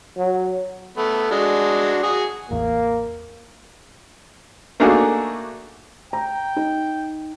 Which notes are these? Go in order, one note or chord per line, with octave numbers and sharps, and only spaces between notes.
F#3
A3 B3
G#3 D4 F#4
F#4 G#4
A1 E2 A#3
A3 A#3 D4 D#4 F#4 G#4
G5 A#5
D#4